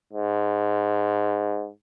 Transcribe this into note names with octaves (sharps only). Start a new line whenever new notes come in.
G#2